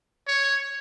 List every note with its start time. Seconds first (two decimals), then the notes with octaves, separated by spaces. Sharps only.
0.28 C#5